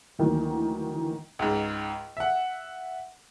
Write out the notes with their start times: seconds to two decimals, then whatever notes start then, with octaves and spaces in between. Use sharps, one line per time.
0.19 D2 D#3 E3 F#3 A#3
1.39 C#2 G#2
2.17 E5 F#5